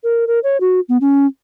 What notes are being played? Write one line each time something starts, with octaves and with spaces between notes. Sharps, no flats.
A#4
A#4
C#5
F#4
B3
C#4